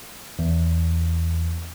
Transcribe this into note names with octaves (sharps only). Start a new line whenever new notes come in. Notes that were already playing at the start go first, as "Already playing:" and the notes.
E2